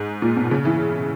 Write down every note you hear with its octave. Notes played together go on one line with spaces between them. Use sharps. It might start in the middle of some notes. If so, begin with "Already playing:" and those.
Already playing: G#2
A#2
B2
C#3
E3